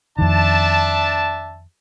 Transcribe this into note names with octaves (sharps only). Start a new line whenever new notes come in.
F2 D#3 D4 E5 A5